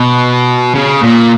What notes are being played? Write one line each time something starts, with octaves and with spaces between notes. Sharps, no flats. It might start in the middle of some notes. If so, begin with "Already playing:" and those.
Already playing: B2
C#3
A#2